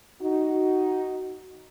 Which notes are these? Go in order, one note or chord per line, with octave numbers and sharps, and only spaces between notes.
D#4 F#4